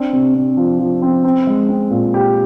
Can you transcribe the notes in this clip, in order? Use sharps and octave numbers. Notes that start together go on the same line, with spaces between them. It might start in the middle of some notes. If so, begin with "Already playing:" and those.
Already playing: C4 D4
C3
C3
F3
F3
C4
C4
G#3
C4
A#2
G4